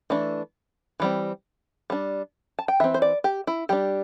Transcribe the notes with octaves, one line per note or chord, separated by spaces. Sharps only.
E3 A3 D4
E3 G3 C4
G3 D4
A5
G5
E3 C4 E5
C5
D5
G4
E4
G3 D4 G4